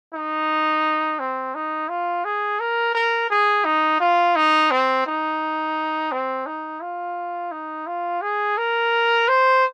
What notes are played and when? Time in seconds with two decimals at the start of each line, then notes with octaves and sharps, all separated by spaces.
0.14 D#4
1.19 C4
1.55 D#4
1.89 F4
2.24 G#4
2.60 A#4
2.95 A#4
3.30 G#4
3.65 D#4
4.00 F4
4.36 D#4
4.71 C4
5.06 D#4
6.12 C4
6.47 D#4
6.82 F4
7.52 D#4
7.87 F4
8.22 G#4
8.57 A#4
9.28 C5